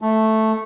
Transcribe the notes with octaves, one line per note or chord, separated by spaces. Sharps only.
A3